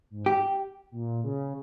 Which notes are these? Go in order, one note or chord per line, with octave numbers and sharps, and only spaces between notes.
G#2
G4
A#2
C#3